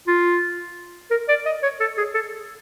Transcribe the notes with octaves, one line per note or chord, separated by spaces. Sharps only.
F4
A#4
D5
D#5
C#5
A4
G#4
A4